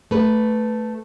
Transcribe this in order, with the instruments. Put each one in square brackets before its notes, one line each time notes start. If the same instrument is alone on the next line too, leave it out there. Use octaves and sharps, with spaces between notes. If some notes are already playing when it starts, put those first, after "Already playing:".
[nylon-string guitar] A3 B4